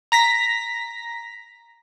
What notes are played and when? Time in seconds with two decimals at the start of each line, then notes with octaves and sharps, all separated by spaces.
0.12 A#5 A#6 B6